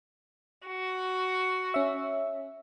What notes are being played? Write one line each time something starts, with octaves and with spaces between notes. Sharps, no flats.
F#4
C#4 E5